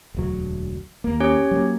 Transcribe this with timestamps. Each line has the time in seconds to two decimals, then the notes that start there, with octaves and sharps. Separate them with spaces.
0.14 E1 D2 F#3
1.04 D#2 A#3
1.20 C#4 G4 C#5
1.51 F#3 A3 A#3